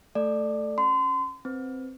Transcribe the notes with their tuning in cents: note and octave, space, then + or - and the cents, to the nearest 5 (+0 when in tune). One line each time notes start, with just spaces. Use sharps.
A3 +0 A4 +0 D5 +15
C#4 -10 C6 -35
C4 +0 B4 +0